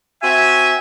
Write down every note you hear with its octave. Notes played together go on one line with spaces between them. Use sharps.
C4 F#4 E5 G#5